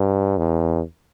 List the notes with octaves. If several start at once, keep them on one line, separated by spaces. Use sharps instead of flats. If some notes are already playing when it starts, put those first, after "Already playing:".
Already playing: G2
E2